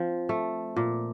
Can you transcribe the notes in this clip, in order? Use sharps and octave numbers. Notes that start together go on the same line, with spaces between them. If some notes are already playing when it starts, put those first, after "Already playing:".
Already playing: F3 C4
A3
A#2